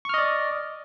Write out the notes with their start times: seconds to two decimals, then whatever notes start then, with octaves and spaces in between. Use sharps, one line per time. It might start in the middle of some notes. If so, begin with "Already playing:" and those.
0.05 C#6
0.09 F6
0.14 D#5
0.18 D5